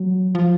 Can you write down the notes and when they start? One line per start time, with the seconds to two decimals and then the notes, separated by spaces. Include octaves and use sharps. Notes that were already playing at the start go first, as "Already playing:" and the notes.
Already playing: F#3
0.35 F3